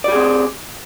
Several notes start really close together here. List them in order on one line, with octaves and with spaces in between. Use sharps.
D5 G4 G#4 C4